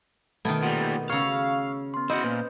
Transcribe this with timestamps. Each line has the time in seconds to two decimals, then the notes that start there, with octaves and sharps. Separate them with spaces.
0.45 B2 D#3 A3 G#6
0.63 A#2 G3 F#5
1.10 C#3 C#5 F5 C#6 E6
1.94 B3 C6
2.10 E4 F#4 C5 D#5
2.24 A#2 B4